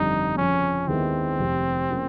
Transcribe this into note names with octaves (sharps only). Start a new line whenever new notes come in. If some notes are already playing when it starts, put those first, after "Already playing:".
Already playing: G1 F2 D3 G3 C4 D#4
F2 C#3 F3 C#4
D#2 D#3 G#3 B3 C4 E4
F1 F2 C3
C#3 F3 A#3 C#4